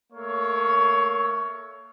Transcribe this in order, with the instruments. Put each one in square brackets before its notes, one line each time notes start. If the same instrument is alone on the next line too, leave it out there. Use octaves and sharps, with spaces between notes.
[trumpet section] A3 A#3 C#5